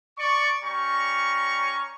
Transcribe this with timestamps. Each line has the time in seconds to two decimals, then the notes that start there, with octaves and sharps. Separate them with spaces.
0.18 D5 C#6
0.64 G3 C#4 A#5 C#6